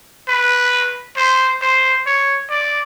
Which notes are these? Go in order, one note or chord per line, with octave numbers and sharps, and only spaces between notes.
B4
C5
C5
C#5
D5